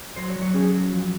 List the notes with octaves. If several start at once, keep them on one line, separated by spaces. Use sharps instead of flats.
F#3 C5
C#5
F#3
C#5
C#4 G#4
F#3
F3